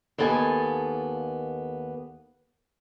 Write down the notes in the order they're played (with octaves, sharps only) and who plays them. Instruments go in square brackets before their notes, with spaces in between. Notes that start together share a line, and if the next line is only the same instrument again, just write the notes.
[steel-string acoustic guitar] D#2 A#3 B3 A4 F5 G#5